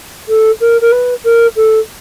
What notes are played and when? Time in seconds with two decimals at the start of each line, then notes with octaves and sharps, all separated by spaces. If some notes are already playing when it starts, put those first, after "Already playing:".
0.28 A4
0.60 A#4
0.81 A#4
0.92 B4
1.24 A#4
1.56 A4